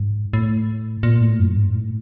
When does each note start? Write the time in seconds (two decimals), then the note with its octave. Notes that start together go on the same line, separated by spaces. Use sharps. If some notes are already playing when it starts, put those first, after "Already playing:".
Already playing: G#2
0.33 A2
1.03 A#2
1.21 A2
1.39 F#2
1.57 G#2
1.75 A2